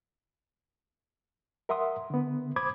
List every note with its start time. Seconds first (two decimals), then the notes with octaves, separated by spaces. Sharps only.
1.69 A#4 E5 F#5 C6 D#6
2.10 D3 B3
2.56 C5 B5 D6 D#6 G#6